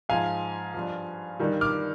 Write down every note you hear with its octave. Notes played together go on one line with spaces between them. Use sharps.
G#2 F3 F5 G#5
G2 F3
G2 D#3 G3
D6 F6